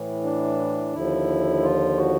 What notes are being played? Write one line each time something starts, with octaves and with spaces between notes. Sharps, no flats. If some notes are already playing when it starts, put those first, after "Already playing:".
Already playing: A2 E3
D4
D#2 D3 F3 E4
F4
F#4